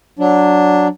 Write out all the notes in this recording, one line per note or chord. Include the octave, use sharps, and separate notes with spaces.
F#3 D4